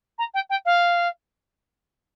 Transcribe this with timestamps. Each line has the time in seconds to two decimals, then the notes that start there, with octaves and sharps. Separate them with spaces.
0.18 A#5
0.34 G5
0.50 G5
0.65 F5